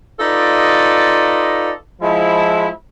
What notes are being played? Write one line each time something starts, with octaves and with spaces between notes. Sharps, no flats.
D#4 F4 A4 B4 D5 D#5
F3 G#3 E4